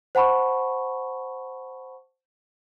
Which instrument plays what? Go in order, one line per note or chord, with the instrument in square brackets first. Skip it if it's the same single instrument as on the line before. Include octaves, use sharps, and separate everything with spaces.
[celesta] C5 F#5 A5 B5 C#6